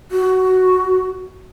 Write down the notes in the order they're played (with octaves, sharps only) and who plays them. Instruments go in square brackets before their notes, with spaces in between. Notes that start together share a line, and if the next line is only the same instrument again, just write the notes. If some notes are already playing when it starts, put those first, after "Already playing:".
[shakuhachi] F#4